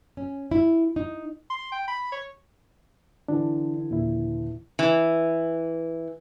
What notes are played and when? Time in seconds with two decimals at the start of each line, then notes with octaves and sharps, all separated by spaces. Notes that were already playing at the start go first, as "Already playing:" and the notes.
0.17 C#4
0.51 E4
0.96 D#4
1.50 C6
1.72 G5
1.88 B5
2.12 C#5
3.28 D3 E3 D4
3.91 D#2 A#2 E4
4.79 E3